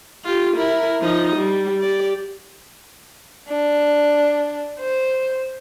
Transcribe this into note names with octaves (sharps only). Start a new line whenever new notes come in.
F4 G4
E4 A#4
F3 D#4
G3
G4 D5
D4
C5